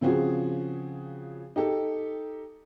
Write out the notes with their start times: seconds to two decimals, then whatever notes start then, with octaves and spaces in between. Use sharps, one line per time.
0.01 C#3 F3 C4 F#4 G#4
1.56 D#4 G4 A4